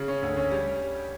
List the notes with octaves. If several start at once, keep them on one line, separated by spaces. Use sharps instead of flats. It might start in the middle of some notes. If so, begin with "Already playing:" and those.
Already playing: C#3
C#4
D2
C#4
G3